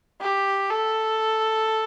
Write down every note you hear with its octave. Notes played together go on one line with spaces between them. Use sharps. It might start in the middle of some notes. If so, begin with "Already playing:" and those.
G4
A4